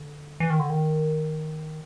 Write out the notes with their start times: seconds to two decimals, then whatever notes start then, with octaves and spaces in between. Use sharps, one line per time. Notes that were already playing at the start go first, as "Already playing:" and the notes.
Already playing: D3
0.40 E3
0.50 D#3
0.59 D3
0.70 D#3